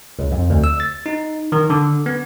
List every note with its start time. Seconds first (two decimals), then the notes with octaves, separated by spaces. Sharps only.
0.19 C#2
0.32 F2
0.50 D2
0.64 E6
0.80 A6
1.06 D#4
1.52 D#3
1.70 D3
2.06 B3